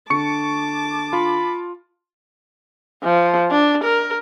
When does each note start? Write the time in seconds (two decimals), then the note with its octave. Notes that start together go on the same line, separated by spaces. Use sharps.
0.10 D3 A5 C#6 D6 C#7
1.13 F4 B5
3.04 F3
3.51 D4
3.84 A#4